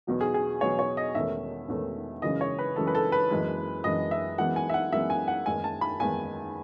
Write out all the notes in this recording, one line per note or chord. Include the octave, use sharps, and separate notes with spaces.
E2 B2 F#3
G#4
G#4
E2 B2 F#3 C#5
C#5
D#5
E1 E2 D#3 A3 C#4 E5
E1 E2 D#3 A3 C#4
F#2 C#3 E3 G#3 C#4 D#5
C#5
B4
F#2 C#3 E3 G#3 C#4 A4
B4
A4
B4
F#1 F#2 E3 G#3
F#1 F#2 E3 G#3 D#5
E5
F#2 E3 G#3 B3 F#5
G#5
E5
F#5
F#2 E3 G#3 B3 E5
G#5
F#5
F#1 E2 D#3 G#3 G#5
A5
B5
F#1 E2 D#3 G#3 G#5